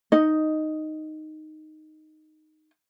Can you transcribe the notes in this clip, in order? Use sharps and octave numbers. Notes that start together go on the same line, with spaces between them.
D#4 D#5